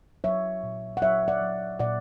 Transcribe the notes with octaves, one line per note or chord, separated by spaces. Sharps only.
F#3 C#5 E5
A#2
F#5
F#3 C#5 E5
D5 F#5
F#3
A#2 D5 F#5